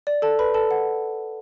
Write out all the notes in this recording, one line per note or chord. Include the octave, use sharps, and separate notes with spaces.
D5
A4 A5
B4 B5
A4 A5
F#5